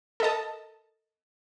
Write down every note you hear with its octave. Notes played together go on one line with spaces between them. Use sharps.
A4 A#4 D#5 A5